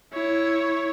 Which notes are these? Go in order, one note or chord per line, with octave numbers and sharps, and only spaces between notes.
E4 C#5